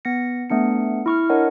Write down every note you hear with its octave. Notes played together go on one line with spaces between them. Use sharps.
B3 A#6 C#7
A3 B3 D4 C#7
E4 C#6 F6
D4 A#4 C#5 D#5 F#5